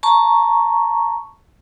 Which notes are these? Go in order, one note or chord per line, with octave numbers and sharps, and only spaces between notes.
A5 A#5 C#6